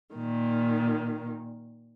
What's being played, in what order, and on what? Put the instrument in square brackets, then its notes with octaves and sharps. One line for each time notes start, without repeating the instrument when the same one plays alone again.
[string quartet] A#2 D#3